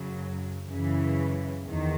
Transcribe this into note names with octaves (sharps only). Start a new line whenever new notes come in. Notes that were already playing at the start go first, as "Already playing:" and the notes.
Already playing: F#2 C#3 F#3
F#2 C#3 E3
E2 D#3